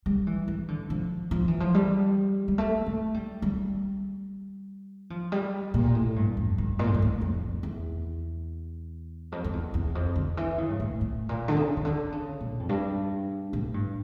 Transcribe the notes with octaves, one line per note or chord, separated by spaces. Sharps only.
G3
E3
E3
D3
F3
F3
E3
F3
G3
G3
A3
A3
G3
G3
F3
G3
A#2
A2
G2
F2
G2
A#2
A2
G2
A2
F2
E2
F2
F2
E2
E2
F2
D3
E3
C#3
G2
A2
A2
A#2
D3
C#3
C#3
D3
C#3
A#2
F2
G2
A2
G2